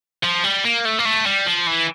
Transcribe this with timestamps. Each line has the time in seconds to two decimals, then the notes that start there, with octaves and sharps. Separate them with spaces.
0.23 F3
0.44 G3
0.64 A#3
0.85 A3
0.99 A#3
1.05 A3
1.26 G3
1.46 F3
1.67 E3